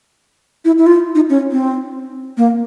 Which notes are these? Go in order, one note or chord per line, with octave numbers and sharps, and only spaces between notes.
E4
E4
F4
D#4
C#4
C4
A#3